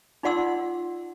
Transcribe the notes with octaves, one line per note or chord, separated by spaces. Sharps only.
D#4 F4 D5 F#5 C6 E6